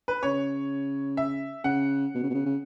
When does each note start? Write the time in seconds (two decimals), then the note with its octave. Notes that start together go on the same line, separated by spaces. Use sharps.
0.08 B4
0.23 C#3 C#5
1.17 E5
1.64 C#3 F#5
2.15 B2
2.23 C#3
2.30 B2
2.34 C#3
2.46 C#3